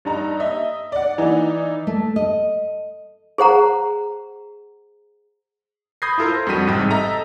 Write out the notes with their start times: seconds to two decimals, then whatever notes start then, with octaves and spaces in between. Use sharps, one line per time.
0.05 G2 D#4 A#5
0.40 D#5 E5
0.92 D5 F#5
1.18 E3 D#4 E4 D5
1.87 A3
2.16 D#5
3.38 G#4 C5 F#5 A#5
6.02 B5 D#6 G6 G#6 A#6 C7
6.18 E4 F4 A4 A#4
6.30 C5 A#6
6.47 F2 G3 D4 F#4 B6 D#7
6.67 A1 G#2 C3 G3 G5 D#7
6.91 A4 D#5 E5 A#5